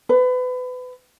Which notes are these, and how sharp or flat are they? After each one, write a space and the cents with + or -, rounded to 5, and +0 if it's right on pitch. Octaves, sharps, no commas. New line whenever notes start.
B4 +30